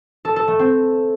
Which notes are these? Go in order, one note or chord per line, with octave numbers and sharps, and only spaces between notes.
A4
A4
A3
C4